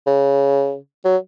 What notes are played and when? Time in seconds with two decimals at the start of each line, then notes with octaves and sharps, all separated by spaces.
0.07 C#3
1.05 F#3